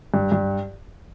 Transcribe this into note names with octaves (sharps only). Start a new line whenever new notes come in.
G2
G2